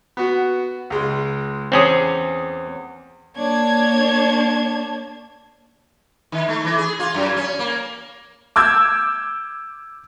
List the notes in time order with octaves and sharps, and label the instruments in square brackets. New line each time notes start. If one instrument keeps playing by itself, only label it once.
[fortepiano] B3 F#4
C#2 G#3
[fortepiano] E2 D6 D#6 [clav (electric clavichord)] C4 C#4 G#4
[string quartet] A#3 D4 C#5 A5 G#6
[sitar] D#3
A3
E3
G#4
F4
F#2
C#4
A#3
[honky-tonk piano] D6 E6 G6 G#6